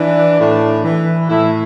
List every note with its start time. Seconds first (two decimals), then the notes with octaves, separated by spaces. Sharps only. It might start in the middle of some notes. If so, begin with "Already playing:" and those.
Already playing: E3 D4
0.39 A2
0.84 E3
1.29 A2 E4